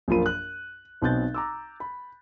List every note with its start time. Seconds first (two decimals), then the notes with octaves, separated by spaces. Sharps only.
0.08 A#1 F#2 A#3 F4 B5 D#7
0.26 F#6
1.02 B1 B2 C4 F#6 G6 A6
1.34 A#5 D6 E6
1.80 B5